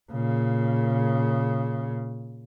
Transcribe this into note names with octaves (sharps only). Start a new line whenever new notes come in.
A#2 C#3